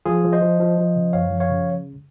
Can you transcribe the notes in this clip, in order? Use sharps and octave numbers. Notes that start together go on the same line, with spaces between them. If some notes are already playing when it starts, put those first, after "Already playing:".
F3 F4 G#4
F3
C5 D#5
F3
F3
F3
C#3
F#2 C#5 F5
F3
C#5 F5
C#3